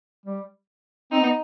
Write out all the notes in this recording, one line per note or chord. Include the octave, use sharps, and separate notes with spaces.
G3
C4 D#4
B3